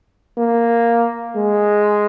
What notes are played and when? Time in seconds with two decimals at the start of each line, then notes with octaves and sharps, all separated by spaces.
0.38 A#3
1.36 G#3